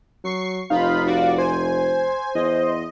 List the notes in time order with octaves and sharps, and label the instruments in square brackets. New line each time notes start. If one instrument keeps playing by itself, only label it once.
[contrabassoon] F#3 [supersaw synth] C#6 C7
[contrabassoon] F1 [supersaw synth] D#4 F4 B5 [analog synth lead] F5
[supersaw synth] F#4 D5
[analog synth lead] C5 [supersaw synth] G#5
[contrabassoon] E2 [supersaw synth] D#5